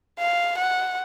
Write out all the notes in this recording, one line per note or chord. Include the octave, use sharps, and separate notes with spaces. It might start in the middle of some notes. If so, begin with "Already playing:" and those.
F5
F#5